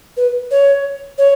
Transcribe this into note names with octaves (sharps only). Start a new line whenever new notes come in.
B4
C#5
C#5